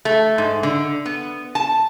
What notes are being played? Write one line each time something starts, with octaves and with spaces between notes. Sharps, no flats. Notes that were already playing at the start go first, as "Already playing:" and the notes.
A3
G#2
D3
B3
A5